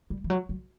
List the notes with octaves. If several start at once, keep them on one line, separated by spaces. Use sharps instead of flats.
G3
E3
F#3
F#3